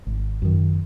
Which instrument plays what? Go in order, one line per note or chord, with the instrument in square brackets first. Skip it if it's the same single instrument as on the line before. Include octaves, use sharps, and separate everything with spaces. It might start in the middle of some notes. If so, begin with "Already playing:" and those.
[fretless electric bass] G#1
F#2 D#3